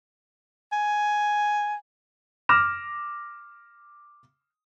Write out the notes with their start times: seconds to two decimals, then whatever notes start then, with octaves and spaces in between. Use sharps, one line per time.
0.72 G#5
2.49 D6 F6 A#6 E7